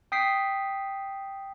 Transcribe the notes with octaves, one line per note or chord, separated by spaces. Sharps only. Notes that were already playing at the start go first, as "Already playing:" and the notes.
G5 D#6 B6 C7